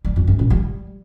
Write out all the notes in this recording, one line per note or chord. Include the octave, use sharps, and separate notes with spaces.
G3
F2
F#2
A#2
G3